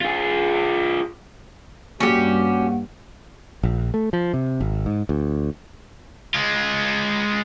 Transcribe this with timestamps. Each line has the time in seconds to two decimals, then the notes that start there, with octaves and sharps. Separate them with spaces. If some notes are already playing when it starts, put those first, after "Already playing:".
0.01 F4 G#4
2.00 G2 G3 A#3 C#4 F#4 G4
3.63 A#1
3.94 A3
4.13 F3
4.34 C3
4.61 G#1
4.86 G#2
5.09 D2
6.34 G#3 F4